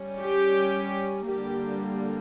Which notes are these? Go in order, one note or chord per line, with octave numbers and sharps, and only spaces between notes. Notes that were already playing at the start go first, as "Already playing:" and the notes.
Already playing: G3 C#4
G4
D3 G3 A#3 G4